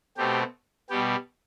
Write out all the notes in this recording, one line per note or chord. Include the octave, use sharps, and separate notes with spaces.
B2 A3 C4 G4
B2 G3 B3 G4